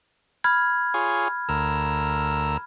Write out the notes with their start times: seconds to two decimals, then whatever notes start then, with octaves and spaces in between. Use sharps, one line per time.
0.44 B5 F6 G#6
0.94 F4 G#4 C#5
1.49 D2 A#4 E6